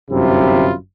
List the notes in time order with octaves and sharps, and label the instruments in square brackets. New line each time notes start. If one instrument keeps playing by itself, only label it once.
[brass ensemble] G1 F#2 C3 E4 F4